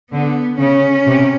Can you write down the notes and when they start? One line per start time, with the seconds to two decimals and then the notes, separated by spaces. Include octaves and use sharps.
0.12 D3 B3
0.59 C#3 C#4
1.06 C3